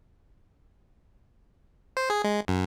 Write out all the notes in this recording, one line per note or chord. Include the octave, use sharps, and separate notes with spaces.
C5
G#4
G#3
F#2